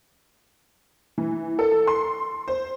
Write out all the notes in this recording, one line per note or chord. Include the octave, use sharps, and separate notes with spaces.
E3
A4
C6
C5